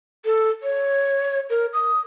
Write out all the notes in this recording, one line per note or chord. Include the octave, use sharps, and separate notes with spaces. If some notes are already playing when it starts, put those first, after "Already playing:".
A4
C#5
A#4
D#6